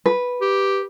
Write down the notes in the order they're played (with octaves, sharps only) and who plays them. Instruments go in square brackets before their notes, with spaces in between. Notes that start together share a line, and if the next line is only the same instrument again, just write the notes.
[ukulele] B4
[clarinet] G4